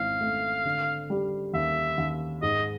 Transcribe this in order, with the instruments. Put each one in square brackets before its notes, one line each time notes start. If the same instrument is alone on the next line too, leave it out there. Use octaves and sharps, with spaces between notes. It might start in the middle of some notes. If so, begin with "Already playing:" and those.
Already playing: [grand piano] G#1 E3 [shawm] F5
[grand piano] A3
D3
G3
[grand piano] D#2 [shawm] E5
[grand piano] D#2
[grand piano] G#2 [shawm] D#5